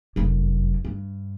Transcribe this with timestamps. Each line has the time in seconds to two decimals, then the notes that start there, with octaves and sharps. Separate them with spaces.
0.16 F1 F#2
0.85 G2